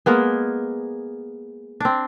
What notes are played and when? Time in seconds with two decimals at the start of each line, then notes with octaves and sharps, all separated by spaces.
0.06 G#3 A#3 B3 G#4
1.80 C4 D4